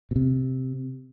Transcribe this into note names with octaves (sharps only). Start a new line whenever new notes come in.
B2
C3